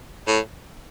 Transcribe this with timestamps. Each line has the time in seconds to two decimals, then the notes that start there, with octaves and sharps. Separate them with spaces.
0.28 A2